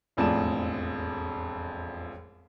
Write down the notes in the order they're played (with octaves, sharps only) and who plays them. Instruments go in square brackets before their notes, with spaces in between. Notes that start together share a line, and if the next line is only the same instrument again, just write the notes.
[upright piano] E1 A1 F2 G#4 D5 E7